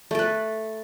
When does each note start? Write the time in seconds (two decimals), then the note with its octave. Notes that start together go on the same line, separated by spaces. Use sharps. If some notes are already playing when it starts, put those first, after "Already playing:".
0.11 A3
0.15 A4
0.19 B4